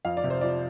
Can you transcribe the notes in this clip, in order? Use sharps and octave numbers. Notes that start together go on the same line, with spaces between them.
F2 F5
D5
C3
C5
F3 D5